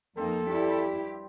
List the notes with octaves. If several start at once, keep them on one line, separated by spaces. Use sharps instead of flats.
F2 A#3 C4 D#4 A4
G2 C4 E4 G4